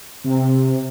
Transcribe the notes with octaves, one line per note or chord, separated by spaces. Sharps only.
C3